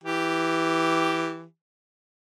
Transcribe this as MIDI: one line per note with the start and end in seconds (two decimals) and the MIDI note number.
0.04 1.44 52
0.04 1.44 67